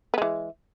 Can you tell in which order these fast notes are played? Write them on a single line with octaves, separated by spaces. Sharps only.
B3 G#3 E3